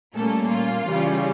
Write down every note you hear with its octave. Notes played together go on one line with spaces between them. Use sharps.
A#2 G3 A3 A#3 C#4 A4
F4
C#3 E3 G3 C#4